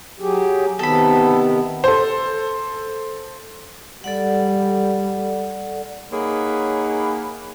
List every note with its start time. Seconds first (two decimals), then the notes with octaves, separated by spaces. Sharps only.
0.20 F#3 G4 G#4
0.79 C3 D#3 B3 A4 B5
1.84 A4 C5
4.04 G3 A4 D5 F#5
6.11 A#3 D#4 G#4 C#5 F#5 B5